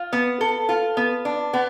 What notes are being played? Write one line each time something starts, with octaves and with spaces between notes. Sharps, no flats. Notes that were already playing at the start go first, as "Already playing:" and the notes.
Already playing: F4
B3
A4
F4
B3
D4
B3